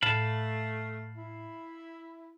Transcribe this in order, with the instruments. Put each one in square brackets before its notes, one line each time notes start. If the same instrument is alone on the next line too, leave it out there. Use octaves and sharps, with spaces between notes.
[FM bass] A2 [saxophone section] A3 [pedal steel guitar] F5 A5 [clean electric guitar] B5
[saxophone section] E4